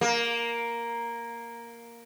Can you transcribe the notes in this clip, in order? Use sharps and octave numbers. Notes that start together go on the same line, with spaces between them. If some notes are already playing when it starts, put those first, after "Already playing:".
A#3